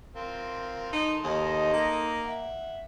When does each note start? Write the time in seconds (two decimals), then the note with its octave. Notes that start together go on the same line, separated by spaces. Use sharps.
0.16 C4 F4 A#4
0.93 D#3 D#4 A4 C6
1.24 D#2 D#4 D#5
1.73 A#3
2.25 E5 F#5